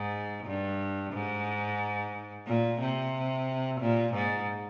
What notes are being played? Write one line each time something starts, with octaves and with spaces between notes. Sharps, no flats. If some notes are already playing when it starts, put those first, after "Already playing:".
Already playing: G#2
G2
G#2
A#2
C3
A#2
G#2